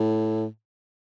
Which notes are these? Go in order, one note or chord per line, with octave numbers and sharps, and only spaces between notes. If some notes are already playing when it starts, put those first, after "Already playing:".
Already playing: A2